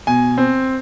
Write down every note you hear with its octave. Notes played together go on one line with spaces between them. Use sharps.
B2 G#5
C4